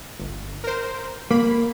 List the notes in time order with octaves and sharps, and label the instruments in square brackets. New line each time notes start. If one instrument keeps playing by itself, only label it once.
[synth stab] G1
A#4 C5
[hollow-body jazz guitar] A#3 [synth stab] B5